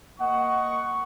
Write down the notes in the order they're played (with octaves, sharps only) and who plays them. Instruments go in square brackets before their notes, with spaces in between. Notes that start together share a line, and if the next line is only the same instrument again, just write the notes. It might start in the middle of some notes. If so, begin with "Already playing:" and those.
[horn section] A#3 D#5 F#5 [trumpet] C#6